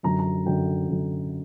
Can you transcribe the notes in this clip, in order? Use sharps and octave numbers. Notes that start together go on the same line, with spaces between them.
F#2 D3 F#3 A#5
A#5
F#2 D3 F#3 G5
F#2 D3 F#3